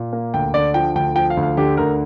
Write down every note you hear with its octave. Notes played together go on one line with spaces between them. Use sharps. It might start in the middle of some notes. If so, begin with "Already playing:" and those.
Already playing: A#2
A#3
D2 G5
D3 D5
F3 G5
D2 G5
F3 G5
F5
D2
F5
D3 G4
D2 A#4